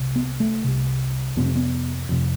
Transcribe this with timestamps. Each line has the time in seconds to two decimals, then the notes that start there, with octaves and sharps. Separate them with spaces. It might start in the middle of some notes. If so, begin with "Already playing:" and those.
Already playing: C2 C3
0.16 B3
0.40 A3
0.64 C2 C3
1.36 F2 C3 B3
1.46 C4
1.55 B3
2.09 F2 C3